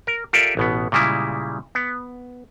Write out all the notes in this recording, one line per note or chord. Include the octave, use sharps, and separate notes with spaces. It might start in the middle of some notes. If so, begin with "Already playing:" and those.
A#4
F4 G4 A4 A#4 D5 E5
A1 B2 B3
A#2 C#3 G3 G#3 E4
B3